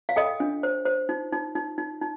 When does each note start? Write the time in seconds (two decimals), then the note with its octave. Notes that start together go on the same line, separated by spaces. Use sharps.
0.09 F5
0.16 A4 D#5 G5
0.40 D4
0.63 C5
0.85 C5
1.09 D#4
1.32 D#4
1.55 D#4
1.78 D#4
2.01 D#4